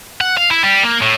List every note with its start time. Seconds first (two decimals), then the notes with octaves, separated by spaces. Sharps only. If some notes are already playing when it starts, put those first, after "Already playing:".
0.21 F#5
0.37 F5
0.51 E4
0.63 G3
0.84 A#3
1.02 A2